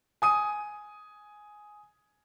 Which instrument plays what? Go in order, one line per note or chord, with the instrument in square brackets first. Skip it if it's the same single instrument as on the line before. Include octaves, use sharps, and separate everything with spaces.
[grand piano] G#5 D#6 D#7